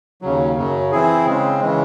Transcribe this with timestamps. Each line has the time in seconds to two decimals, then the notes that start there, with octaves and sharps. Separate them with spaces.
0.22 D#2 C#3 F#3
0.56 F#2 C#3 F#3
0.92 E3 C4 E4 G#4
1.26 C#3 G#3 C4
1.61 C#3 E3 G#3